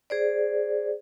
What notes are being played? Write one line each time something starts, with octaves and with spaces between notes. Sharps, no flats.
G#4 C5 D5